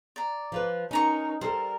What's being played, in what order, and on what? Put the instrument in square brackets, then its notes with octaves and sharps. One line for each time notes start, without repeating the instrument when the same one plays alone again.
[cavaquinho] D5 A#5
[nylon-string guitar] F3 F4 B4
[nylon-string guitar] C#4 [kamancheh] D#4 A#4 [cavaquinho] D#5 A#5 C#6
[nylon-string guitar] G3 A4 [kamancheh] A#4 [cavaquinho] C5